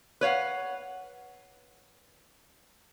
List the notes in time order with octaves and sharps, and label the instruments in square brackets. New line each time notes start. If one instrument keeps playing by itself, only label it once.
[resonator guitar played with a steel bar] B4 C#5 F5 F#5